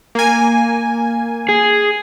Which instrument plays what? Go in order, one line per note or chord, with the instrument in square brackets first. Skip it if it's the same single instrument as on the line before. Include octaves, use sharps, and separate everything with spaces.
[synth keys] A#3 G#5
[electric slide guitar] G#4